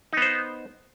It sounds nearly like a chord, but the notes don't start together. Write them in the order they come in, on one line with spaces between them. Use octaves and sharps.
D#4 B3 C5